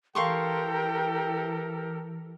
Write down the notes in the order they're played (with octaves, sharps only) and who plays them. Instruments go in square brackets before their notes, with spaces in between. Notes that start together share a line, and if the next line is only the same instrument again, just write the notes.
[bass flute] E3 [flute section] G4 A4 A#4 [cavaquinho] F5 C6 C#6 [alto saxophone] G5